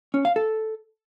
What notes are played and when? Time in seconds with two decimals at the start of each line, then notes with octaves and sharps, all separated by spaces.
0.14 C#4
0.25 F5
0.36 A4